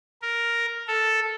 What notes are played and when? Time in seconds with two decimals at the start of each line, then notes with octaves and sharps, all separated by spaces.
0.22 A#4
0.88 A4